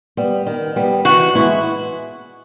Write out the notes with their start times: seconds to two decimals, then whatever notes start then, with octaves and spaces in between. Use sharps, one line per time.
0.17 G3 B3
0.46 D#3
0.76 G3 B3
1.05 E3 F#4
1.35 G#3 B3 E4